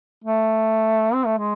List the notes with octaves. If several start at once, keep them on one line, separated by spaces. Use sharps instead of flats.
A3
C4
A3
G#3